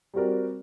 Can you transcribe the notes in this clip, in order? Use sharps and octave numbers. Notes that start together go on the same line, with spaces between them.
G3 C4 F#4 A#4 D5